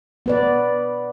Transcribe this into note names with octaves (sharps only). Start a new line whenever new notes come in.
B3 B4 D5